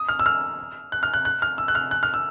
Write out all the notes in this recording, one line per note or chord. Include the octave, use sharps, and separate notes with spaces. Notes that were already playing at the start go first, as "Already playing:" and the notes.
Already playing: D#6
F6
E6
F6
F#6
F6
F#6
F#6
F6
E6
F#6
F6
F#6
F6
E6